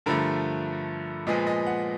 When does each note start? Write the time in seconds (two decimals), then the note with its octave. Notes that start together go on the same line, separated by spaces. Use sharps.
0.06 G2 D3 F3 A3 A#4
1.27 A#2 F3 G#3 B3 D#5
1.47 D#5
1.67 F#5